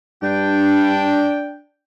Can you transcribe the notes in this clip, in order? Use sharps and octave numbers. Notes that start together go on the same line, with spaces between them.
G2 D4 G5